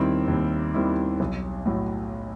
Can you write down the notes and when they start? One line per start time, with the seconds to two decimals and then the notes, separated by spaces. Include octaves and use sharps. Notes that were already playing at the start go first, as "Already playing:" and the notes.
Already playing: D#2 D#3 G3 C4 E4
0.28 D#2
0.74 D#3 G3 C4 E4
1.20 B1
1.66 A2 F#3